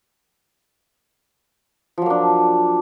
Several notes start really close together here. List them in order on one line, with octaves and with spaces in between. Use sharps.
F3 F#3 A#3 D4